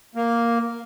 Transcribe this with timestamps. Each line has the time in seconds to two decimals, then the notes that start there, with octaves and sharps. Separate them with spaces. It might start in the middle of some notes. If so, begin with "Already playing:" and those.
0.15 A#3